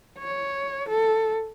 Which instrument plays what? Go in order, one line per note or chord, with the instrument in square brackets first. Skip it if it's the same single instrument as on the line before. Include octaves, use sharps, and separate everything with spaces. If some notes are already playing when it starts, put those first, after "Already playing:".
[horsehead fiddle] C#5
A4